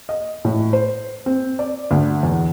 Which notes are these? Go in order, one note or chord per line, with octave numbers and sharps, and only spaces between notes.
D#5
A2
C5
C4
D5
D2
E2